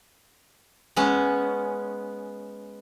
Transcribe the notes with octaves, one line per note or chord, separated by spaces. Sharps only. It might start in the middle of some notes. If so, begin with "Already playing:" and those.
G#3 B3 C#4